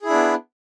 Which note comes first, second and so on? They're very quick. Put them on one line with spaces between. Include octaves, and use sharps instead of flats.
G#4 E4 D4 B3